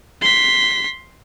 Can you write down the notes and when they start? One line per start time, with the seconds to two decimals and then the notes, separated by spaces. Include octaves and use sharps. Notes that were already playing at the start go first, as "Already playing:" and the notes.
0.21 C6 B6